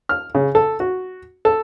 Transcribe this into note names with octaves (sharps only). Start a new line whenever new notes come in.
F6
C#3
A4
F#4
A4